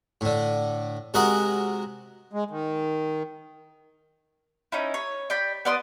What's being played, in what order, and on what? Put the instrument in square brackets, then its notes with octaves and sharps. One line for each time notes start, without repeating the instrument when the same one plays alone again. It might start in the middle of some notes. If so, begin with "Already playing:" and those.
[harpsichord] A2 D3
C3 G#3 F#4 A#4 F#5 D#6
[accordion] G#3
D#3
[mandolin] C#4 D#4 E4
C#5
D5 G5 B5
B3 D5 C6 D#6